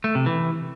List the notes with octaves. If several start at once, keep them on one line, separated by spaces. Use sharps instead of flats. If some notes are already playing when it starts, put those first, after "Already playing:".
A3
C3
E3